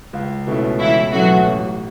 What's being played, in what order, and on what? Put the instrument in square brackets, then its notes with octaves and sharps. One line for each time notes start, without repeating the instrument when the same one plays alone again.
[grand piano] C#2
B2 A3 C#4 E4
[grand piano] C#2 [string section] E3 E4
[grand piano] B2 A3 C#4 E4 [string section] F#3 F#4
[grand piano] A1